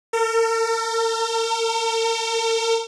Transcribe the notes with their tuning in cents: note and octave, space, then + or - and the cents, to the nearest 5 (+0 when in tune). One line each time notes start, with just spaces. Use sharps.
A#4 -45